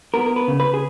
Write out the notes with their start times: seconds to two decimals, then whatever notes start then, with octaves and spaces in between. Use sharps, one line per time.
0.14 B3 A#4
0.26 A#4
0.36 B4
0.48 C#3
0.60 B4
0.74 G#4